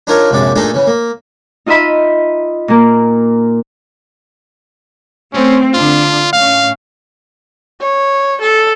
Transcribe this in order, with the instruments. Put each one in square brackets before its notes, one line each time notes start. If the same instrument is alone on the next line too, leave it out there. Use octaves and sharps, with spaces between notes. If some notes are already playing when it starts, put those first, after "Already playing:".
[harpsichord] D4 D#4 F4 A#4 C#5
A#1 F#2 C3 G#3 D5
A#2 A3 D4 D#4 G#4 A4
C#3 E3
A#3
[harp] D#4 F4 D#5 E5 B5
A#2 A#3
[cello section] A3 C4 [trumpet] C#4
[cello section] D3 D4 [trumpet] F4
[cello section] A2 C#4 [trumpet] F5
[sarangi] C#5
A4